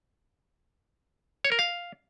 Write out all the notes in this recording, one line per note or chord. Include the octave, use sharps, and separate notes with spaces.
C#5
A#4
F5